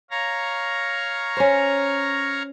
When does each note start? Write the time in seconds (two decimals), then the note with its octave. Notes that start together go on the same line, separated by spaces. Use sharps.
0.11 C#5 F5 A#5
1.37 C#4 C5